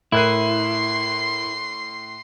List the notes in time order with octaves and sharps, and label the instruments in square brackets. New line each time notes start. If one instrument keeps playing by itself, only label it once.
[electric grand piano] A2 [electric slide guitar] E4 [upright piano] A#4 F#6 D#7 [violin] C6 C7